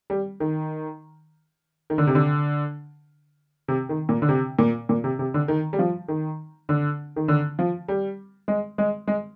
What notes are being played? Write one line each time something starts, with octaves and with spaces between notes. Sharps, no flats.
G3
D#3
D#3
D3
C3
D3
C3
D#3
A#2
D3
C3
A#2
A#2
C3
C3
D3
D#3
G3
F3
D#3
D3
D#3
D3
F3
G3
G#3
G#3
G#3